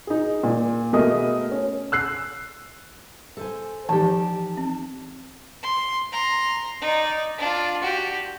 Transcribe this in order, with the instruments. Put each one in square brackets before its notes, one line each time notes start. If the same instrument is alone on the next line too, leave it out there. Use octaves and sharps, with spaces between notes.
[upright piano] D#4 G#4
A#2
B2 A3 G#4 A#4 D#5 D#6
C#4
E6 F#6 C7
[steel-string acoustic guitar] A4 C5 G#5
[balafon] E3 F3 [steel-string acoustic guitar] D#4 G4 [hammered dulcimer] A5
[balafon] C4
[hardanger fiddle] C6
A#5 C6
D#4 D5
D4 F4
F#4 G4